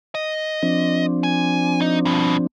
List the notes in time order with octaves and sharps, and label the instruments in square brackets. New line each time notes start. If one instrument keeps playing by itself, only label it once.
[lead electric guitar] D#5
[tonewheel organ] F3 C4 D4
[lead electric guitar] G#5
D#4
G2 B2